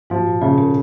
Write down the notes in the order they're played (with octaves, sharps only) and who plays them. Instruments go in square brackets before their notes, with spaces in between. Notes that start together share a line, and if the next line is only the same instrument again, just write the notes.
[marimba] G#2 [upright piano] F3
[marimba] A#2
[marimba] A#2 [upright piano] C#3
[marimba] B2